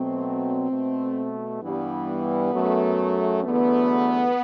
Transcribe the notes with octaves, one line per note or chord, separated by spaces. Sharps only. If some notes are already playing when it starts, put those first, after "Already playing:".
Already playing: B2 F#3 A3 C4
B2 A3
G2 E3 G3 B3
F#2 F#3 A3
E2 D3 F#3 A3 B3